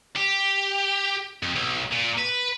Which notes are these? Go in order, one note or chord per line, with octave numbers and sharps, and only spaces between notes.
G4
F2
B1
A#2
B4